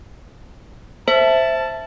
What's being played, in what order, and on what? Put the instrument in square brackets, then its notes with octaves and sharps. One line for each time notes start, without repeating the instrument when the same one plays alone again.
[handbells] C5 [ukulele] E5 [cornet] A5